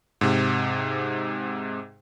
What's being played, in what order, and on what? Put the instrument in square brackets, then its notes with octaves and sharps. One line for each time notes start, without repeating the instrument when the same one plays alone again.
[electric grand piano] G#2 C3